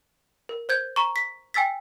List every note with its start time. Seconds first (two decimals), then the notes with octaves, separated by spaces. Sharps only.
0.49 A#4
0.69 C5 G6 G#6
0.96 A#5 C#6
1.16 B6
1.54 G5 G#5 E6 A6 B6